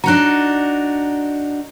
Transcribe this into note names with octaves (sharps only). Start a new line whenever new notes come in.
D4 D#4 F#4 A#5 F#6